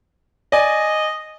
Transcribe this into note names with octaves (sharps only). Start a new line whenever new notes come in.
D5 D#5 G#5